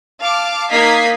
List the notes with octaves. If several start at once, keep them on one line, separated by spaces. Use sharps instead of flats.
F5 A5 D6
A#3 D#4 D#5 G#6 B6 C7